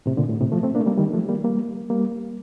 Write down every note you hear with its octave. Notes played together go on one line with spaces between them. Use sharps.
A2 C3
A#2 D3
A2
A2 C3
F3 A3
A3 C4
A#3 D4
A3
G3 A#3
D#3 G3
F3 A3
G3 A#3
G3 A#3
G3 A#3